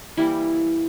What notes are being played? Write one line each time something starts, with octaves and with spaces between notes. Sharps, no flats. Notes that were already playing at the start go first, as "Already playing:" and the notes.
E3 G3 A#3 E4